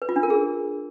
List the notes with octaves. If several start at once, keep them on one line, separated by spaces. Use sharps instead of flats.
B4
F4
D4
A#4
G#4